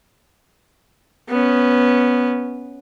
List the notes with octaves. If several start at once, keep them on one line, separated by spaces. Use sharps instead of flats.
B3 C#4